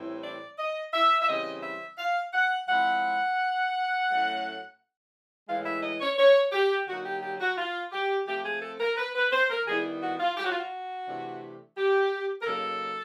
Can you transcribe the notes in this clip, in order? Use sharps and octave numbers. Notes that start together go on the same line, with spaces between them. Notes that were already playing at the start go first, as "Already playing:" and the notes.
Already playing: A2 E3 G3 C4 E4
D5
D#5
E5
E5
C#3 E3 G3 C4 D#5
E5
F5
F#5
F3 G#3 C4 E4 F#5
A2 F#3 A3 C#4
A2 E3 G#3 F5
E5
D#5
C#5
C#5
G4
D3 F#3 A#3 D#4 F#4
G4
G4
F#4
F4
G4
F3 A3 C4 G4
G#4
A4
A#4
B4
B4
C5
A#4
D#3 G3 B3 E4 G#4
F#4
F4
G4
F#4
F4
F#4
C3 E3 A3 D4
G4
A#4
C#3 F#3 A#3 D#4 A4